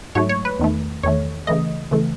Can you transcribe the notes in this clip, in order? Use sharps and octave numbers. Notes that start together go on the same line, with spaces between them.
G#2 F#3 A3 C#5
C#5
B4
E2 D#3 A3
E2 D#3 A3 C#5
C#3 E3 A3 D#5
C#3 E3 A3